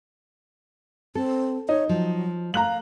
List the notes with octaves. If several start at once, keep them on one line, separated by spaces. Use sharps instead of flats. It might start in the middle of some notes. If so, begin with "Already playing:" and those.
C4 A4
D#4 C#5
F3 F#3
A3 F5 A#5 F#6 F#7